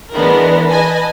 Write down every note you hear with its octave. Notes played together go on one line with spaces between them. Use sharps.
E3 G#3 B3 D4 A#4
B4 D#5 G#5 A5